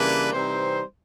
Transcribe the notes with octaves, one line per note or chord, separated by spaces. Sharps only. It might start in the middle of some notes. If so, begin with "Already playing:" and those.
Already playing: C#3 E3 G3 A#3 D4 B4
C3 E3 G3 C4 D#4 C5